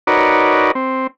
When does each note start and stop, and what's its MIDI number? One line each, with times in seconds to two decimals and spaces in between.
0.07 0.72 63
0.07 0.72 66
0.07 0.72 70
0.07 0.72 71
0.07 0.72 73
0.07 0.72 74
0.75 1.07 60